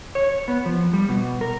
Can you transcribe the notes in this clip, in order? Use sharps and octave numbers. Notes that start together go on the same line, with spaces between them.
C#5
B3
F3
G3
B2
A#4